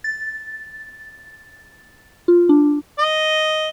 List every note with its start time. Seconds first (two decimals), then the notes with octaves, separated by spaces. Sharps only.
0.04 A6
2.28 F4
2.49 D4
2.99 D#5